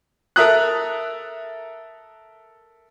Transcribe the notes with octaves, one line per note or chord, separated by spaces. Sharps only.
A4 A#4 E5 A#5 D#6 F#6